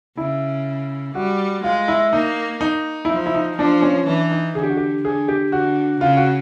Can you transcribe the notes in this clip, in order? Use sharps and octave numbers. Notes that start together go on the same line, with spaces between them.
C#3 E4
G3 F#4
G#3 F4
E4
A#3 D#4
D#4
E4
F3 D#4
E4
D#4
F3 D4
C#4
E3 D4
D#4
D3 G#4
G4
F#4
G4
D3 G#4
G4
D3 F#4
C#3 F4
F#4